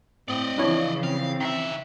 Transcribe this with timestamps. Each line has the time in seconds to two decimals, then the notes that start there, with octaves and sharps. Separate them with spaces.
0.28 A2 C4 D5 D#5
0.58 C#3 E3 F3 D4 E4 C#5
1.04 C4 F5
1.40 D#3 E5